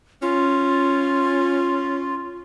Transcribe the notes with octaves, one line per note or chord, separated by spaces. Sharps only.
C#4 F4